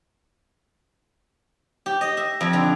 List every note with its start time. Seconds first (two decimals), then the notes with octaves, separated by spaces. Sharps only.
1.86 G4
2.01 D#5
2.17 E5
2.41 F2
2.53 D3